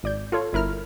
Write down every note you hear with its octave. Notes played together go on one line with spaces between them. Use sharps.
G#1 D5 G6
F4 A4 C#5
G1 E4 A#4 F6